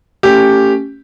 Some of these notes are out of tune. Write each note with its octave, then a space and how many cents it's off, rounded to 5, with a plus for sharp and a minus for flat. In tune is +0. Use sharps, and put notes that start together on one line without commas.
A3 +25 C#4 +0 G4 +0